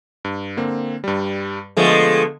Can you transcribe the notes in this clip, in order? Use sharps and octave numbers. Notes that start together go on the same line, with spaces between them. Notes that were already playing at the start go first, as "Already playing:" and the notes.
G2
D3 A#3 C4
G2 G3
D3 F3 G#3 A3 B3